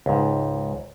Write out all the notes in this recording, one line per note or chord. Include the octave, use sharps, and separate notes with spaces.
C#2 G#2